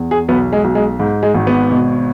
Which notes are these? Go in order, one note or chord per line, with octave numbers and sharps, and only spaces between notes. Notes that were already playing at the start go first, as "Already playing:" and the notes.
Already playing: E2
G#4
B1 B3
G#3
B1
G#3
G#2
G#3
G#1
B3
B2